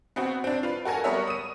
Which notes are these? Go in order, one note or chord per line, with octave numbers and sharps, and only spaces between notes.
B3 C4 F#4
C4 D4
F4 B4
F#4 A4 A#4 G#5
G3 B3 A#4 C#5 E5
D#6 D#7